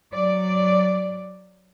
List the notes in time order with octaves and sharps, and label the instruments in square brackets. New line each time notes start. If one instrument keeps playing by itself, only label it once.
[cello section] F#3 D5